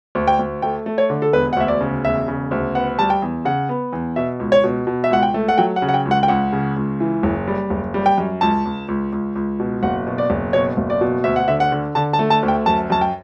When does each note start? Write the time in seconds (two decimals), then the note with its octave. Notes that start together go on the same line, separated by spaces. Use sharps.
0.15 D2
0.27 G5
0.39 D2
0.62 A3 G5
0.86 A3
0.98 C#5
1.10 D3
1.22 A4
1.33 E1 B4
1.53 F#5
1.56 D2 E5
1.68 D5
1.81 C#3
2.04 E1 E5
2.28 C#3
2.51 D2
2.75 B3 F#5
2.98 G3 A5
3.10 G5
3.22 E2
3.45 C#3 F#5
3.69 B3
3.93 E2
4.16 B2 E5
4.40 C#2
4.52 C#5
4.64 B2
4.87 B2
5.04 E5
5.10 C#2 F#5
5.23 G5
5.34 A3
5.49 F#5
5.58 F#3 G5
5.76 F#5
5.82 C#3
5.89 F#5
5.94 G5
6.05 C#2
6.11 F#5
6.23 G5
6.28 C#2 F#5
6.53 C#3
6.76 C#2
7.00 E3
7.23 F#1
7.47 G3
7.70 F#1
7.94 G3
8.06 G5
8.18 F#2
8.41 C#2 A5
8.65 C#2
8.88 C#2
9.12 C#2
9.35 C#2
9.60 B2
9.83 F#1 F#5
10.07 B2
10.18 D5
10.30 F#1
10.53 B2 C#5
10.77 F#1
10.90 D5
11.01 B2
11.24 D2 E5
11.36 F#5
11.48 D3 E5
11.60 F#5
11.72 D3
11.95 D3 A5
12.13 A5
12.19 A3
12.30 A5
12.43 D2
12.48 G5
12.66 F#2 A5
12.90 F#2 A5
13.01 G5